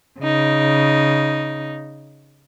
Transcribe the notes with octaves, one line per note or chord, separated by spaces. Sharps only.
C#3 D#4